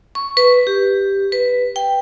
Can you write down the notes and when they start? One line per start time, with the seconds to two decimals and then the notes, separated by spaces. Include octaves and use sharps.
0.15 C#6
0.37 B4
0.67 G4
1.32 B4
1.76 G5